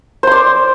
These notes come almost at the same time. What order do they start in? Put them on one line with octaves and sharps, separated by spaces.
C5 C6 D5